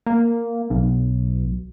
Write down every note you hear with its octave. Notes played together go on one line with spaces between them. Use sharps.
A#3
B1